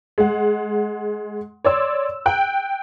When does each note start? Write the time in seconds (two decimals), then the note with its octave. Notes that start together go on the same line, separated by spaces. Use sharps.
0.18 G#3 F#5
1.65 C#5 D5 C6 E6
2.26 G5 F#6